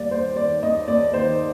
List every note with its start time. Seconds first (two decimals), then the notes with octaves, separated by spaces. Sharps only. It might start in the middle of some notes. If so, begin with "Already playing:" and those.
Already playing: D#2 G3 D5
0.11 D#2 C5
0.36 D#3 D5
0.62 D#2 D#5
0.88 D#2 D5
1.14 D#3 C5